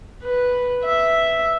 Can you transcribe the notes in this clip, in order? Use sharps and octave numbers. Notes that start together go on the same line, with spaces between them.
B4
E5